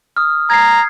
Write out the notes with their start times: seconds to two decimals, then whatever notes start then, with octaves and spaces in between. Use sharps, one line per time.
0.17 D#6 F6
0.50 A#5 G#6 C7